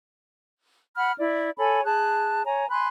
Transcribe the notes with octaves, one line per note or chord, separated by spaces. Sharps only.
F#5 B5 F6
E4 D5
A4 C#5 G#5 B5
G#4 A5 F#6
C#5 G#5 A#5
G#5 B5 C6 F#6